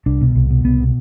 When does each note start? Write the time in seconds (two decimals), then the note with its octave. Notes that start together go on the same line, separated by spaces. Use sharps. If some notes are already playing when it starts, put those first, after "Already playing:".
0.06 C2 D4
0.21 B2
0.35 C2
0.50 B2
0.64 C2 B3
0.79 B2